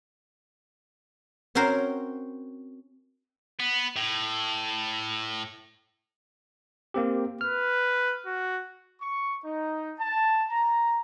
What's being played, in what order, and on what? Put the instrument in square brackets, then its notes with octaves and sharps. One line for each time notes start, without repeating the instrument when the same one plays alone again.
[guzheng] C4 C#4 F#4 A#4 C5
[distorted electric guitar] B3
A2
[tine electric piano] A#3 C4 G4
[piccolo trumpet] B4 [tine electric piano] F6
[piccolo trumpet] F#4
[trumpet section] C#6
D#4
A5
A#5